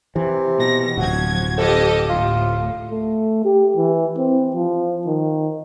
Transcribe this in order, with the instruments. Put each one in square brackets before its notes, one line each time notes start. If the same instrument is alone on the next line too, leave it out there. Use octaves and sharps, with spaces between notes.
[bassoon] C3 [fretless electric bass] E3
[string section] B2 A#6
[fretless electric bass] D1 [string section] F3 G#6 [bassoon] F#4
[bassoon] F2 [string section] G4 A4 D#5
[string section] A2 [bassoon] F4
[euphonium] A3
G4
E3
C4
F3
D#3